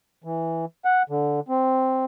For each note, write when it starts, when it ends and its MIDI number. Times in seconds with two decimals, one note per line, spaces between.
0.24 0.65 52
0.85 1.02 78
1.10 1.40 50
1.48 2.05 60